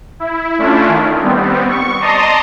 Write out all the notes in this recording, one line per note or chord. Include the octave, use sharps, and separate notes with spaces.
E4
A3 C#4 D4 E4 F4
D#3
G3 B3 C4
C#6
D5 D#5 A5 A#5 C6 D#6